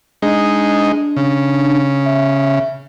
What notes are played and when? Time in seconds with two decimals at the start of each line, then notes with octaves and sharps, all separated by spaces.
0.22 G#3 D4 D#4
1.17 C#3
2.06 E5